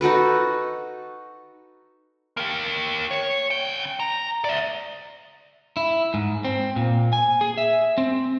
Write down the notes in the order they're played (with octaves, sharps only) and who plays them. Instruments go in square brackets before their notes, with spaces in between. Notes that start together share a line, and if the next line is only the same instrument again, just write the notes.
[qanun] D#4 F#4 A4 B4
[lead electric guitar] A#3 G4
C#5
C#3 G5
A#5
D5 E5
E4
G#2
C4
A#2
G#5
G#4
E5
C4